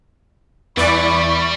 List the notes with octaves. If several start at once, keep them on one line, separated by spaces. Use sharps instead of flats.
E2 E3 G3 D5 E5 B5 C#6